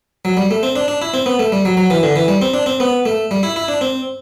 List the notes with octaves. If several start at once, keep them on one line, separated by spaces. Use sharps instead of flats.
F#3
G3
A3
C4
D4
D4
E4
C4
B3
A3
G3
F#3
F#3
E3
D3
E3
G3
C4
D4
C4
B3
A3
G3
E4
E4
D4
C4